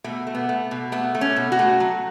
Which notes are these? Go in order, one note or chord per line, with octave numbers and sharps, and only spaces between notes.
B2 A3
A3
B3
A3
B2
A3 B3
A3
C#4
B2
F#4
A3
F#3